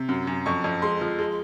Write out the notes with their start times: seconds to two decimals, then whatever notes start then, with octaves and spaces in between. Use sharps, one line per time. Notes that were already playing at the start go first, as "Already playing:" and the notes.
Already playing: C3
0.09 F#2
0.27 F#2
0.46 F2 C#6
0.64 F2
0.82 G#3 C6
1.01 F3
1.19 G#3